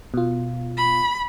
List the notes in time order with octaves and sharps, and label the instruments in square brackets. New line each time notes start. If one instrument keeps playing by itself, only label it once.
[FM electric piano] B2 F4
[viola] B5